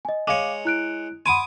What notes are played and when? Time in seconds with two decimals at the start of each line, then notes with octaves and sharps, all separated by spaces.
0.05 D#5 G#5
0.27 G#3 C#5 F5 D6
0.65 E4 F#6 D7
1.26 F#5 G#5 B5 C6 D6 D#6